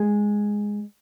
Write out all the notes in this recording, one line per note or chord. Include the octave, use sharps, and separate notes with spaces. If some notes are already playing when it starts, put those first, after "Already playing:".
Already playing: G#3 G#4